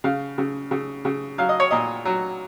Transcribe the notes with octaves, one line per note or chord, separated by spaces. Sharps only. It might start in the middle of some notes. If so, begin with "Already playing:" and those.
C#3 F5
C#3
C#3
C#3
F#3 F5
D#5
C#5
A#2 D#5
F#3